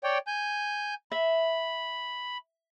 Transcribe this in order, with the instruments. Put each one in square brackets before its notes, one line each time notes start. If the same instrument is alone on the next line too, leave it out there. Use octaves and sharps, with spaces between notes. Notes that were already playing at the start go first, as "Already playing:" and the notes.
[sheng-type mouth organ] C#5 D5 G5
G#5 G6
[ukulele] E5 [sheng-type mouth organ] B5